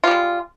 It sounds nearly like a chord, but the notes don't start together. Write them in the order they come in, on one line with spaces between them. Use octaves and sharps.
F4 G3 G#3